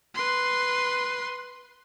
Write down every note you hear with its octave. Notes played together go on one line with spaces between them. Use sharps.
B4 C6